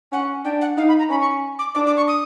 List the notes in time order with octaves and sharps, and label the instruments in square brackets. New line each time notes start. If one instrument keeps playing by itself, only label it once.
[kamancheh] C#4 [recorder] F#5
[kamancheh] D4 [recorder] G5
[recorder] F#5
[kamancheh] D#4 [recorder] F5
[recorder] B5
A#5
[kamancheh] C#4 [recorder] B5
[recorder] C#6
D6
[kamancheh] D4 [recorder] D6
[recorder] D6
C#6
D#6